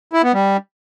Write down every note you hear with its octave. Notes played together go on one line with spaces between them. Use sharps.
E4
B3
G3